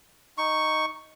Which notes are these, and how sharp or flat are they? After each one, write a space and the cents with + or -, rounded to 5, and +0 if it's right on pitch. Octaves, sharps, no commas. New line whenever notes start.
D#4 +0 C#6 +0